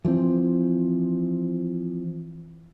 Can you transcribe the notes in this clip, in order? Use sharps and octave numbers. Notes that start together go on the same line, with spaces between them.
E3 F3 A3 C4